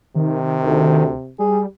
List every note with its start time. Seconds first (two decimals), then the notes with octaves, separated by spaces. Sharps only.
0.16 C3 D#3
0.65 D2
1.39 G3 G#4